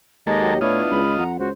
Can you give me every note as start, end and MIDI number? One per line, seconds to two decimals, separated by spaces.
0.27 0.57 39
0.27 0.54 56
0.27 0.54 58
0.27 0.54 69
0.27 0.60 75
0.42 0.59 54
0.42 0.59 66
0.42 0.59 67
0.61 0.82 45
0.61 1.01 59
0.61 1.01 62
0.61 1.01 64
0.61 1.24 65
0.61 0.81 73
0.61 1.24 75
0.91 1.18 37
0.91 1.14 83
1.19 1.37 41
1.19 1.37 78
1.19 1.31 82
1.39 1.51 37
1.39 1.48 66
1.39 1.51 72